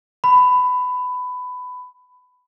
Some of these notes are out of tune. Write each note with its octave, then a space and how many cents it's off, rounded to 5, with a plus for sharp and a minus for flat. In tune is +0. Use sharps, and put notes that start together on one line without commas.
B5 +15